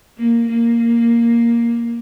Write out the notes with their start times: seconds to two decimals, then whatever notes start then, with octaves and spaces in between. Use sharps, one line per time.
0.18 A#3
0.48 A#3